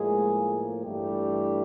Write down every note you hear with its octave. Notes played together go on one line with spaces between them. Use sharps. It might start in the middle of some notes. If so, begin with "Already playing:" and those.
Already playing: A2 F3 G#3 A#3 G#4
G2 E3 G3 A3 G4